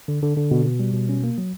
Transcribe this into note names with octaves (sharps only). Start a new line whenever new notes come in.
D3
D3
D3
B2
B2
G3
B2
C#4
A#3
F#3